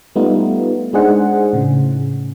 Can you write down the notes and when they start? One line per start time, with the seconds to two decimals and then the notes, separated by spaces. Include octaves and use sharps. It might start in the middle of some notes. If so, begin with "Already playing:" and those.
0.15 G3 A3 B3 D#4 F4
0.93 G#3 D4 D#4 G#4 C5 F#5
1.53 A2 C#3